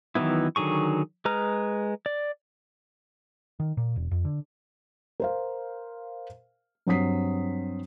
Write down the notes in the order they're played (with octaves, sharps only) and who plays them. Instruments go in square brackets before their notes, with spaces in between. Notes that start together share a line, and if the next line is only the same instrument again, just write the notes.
[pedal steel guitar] D#3 E3 F#3 B3 E4
D3 D#3 F#3 G#4 C#6
G#3 B4 A#5 F6
D5
[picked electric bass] D#3
A#2
E1
F2
D3
[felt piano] A#4 C5 F5
G2 F#3 C4 D#6 B6 C7